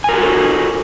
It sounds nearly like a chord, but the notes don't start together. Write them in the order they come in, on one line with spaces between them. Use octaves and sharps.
G#5 A#4 G4 F#4 A4